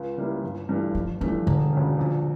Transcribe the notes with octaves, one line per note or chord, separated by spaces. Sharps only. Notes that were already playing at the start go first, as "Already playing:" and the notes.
Already playing: C#2
C#3 G3 A#3 E4
G1
G2 E3 A3
G1 F3
G2 E3 F3 A3
E1 D3
D2 C#3
A#1